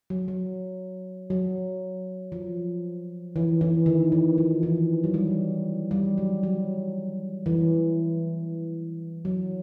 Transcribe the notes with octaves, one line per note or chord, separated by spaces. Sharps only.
F#3
F#3
F#3
F3
E3
E3
D#3
E3
F3
E3
F#3
G3
G3
F#3
F#3
E3
F#3